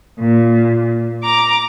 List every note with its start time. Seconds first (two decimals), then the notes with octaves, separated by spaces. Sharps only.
0.19 A#2
1.23 A#5 D6